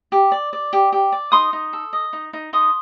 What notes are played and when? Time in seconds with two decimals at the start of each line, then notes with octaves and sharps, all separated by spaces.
0.12 G4
0.32 D5
0.53 D5
0.73 G4
0.92 G4
1.12 D5
1.32 D#4 C6 D#6
1.53 D#4
1.73 A4
1.93 D#5
2.13 D#4
2.33 D#4
2.53 D#4 C6 D#6